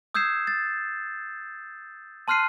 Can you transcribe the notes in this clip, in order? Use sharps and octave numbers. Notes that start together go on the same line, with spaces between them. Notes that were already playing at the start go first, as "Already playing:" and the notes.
D#6 E6 G6 G#6 C7 E7
A6
A5 C6 F6 F#6 C7 D#7